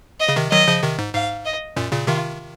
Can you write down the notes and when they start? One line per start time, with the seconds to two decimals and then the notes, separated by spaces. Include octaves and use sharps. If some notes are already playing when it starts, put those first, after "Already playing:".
0.20 D#5
0.29 C#3
0.36 C3 D#3
0.51 D#3 F#3 D#5
0.68 C#3 F3
0.82 C3 D#3
0.99 G#2
1.14 G#2 F5
1.45 D#5
1.76 F#2 A#2
1.92 A#2 C#3
2.07 C3 D#3 F4